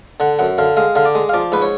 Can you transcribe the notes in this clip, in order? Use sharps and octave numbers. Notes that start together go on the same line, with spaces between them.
D3 F#5
F#2 F#5
D3 F5
G#3 F5
D3 F5
D5
G#3
F5
F3 D5
G#2 B4
C#5